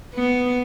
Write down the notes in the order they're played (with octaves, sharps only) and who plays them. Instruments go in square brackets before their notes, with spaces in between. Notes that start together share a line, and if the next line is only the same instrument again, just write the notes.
[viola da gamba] B3